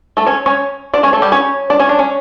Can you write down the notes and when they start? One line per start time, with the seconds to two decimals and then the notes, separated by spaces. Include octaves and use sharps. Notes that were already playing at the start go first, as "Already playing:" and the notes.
0.17 A3 A4
0.26 C#4 C#5
0.46 C#4 C#5
0.94 D4 D5
1.03 C#4 C#5
1.13 A3 A4
1.22 G3 G4
1.32 C#4 C#5
1.70 D4 D5
1.79 C#4 C#5
1.89 D4
1.99 C#4